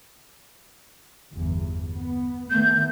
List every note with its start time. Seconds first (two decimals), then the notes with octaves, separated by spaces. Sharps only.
1.33 G1 E2
1.96 B3
2.50 D#3 A3 B3 G6